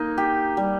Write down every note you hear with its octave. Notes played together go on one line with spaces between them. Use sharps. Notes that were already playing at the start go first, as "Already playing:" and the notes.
Already playing: A#3 D#4
G4
G3